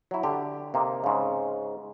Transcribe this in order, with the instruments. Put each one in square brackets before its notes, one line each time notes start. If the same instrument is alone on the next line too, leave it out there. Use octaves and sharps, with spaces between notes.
[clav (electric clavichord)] F#3 E4
D3 G4
C3 A#3 D#4
G#2 C#3